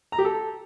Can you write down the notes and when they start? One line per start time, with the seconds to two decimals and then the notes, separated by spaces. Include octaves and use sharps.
0.12 A#5
0.19 G4
0.25 A4